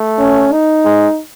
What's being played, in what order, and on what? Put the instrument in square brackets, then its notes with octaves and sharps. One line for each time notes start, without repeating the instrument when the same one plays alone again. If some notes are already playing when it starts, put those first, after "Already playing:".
Already playing: [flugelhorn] A3
[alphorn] C#4
D#4
[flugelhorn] G#3